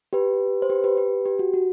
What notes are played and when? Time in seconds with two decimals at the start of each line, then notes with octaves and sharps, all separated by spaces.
0.13 G4 B4
0.62 C5
0.70 G4 B4
0.84 G4 B4
0.97 G4 B4
1.26 G4
1.39 F#4
1.54 F#4